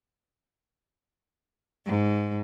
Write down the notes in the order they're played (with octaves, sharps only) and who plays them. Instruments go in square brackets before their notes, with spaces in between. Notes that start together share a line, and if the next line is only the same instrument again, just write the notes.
[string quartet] G#2